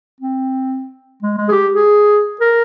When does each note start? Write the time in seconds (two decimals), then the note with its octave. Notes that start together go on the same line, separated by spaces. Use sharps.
0.21 C4
1.23 G#3
1.37 G#3
1.49 G#4
1.52 G4
1.74 G#4
2.41 A#4